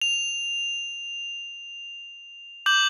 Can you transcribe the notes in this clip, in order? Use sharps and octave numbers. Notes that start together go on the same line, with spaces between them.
F7
D6 G6 F#7